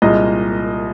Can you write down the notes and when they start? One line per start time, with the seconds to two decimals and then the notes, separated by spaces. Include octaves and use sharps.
0.02 C2 A#2 G#3 D#5